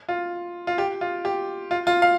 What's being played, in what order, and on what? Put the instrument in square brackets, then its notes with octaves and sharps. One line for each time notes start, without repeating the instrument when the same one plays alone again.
[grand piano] F4
F4
G4
F4
G4
F4
F4
F5